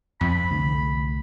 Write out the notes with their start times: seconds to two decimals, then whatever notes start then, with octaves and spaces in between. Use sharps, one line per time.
0.21 F2 B5
0.50 C2 D3 A3